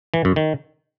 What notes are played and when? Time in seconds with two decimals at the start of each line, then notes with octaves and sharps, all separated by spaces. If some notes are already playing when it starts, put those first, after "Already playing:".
0.14 E3
0.25 F#2
0.36 D#3